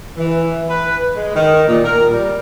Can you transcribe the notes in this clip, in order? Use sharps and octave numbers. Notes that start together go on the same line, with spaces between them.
E3
B4
G#3
D#3
A#2
A#4
G3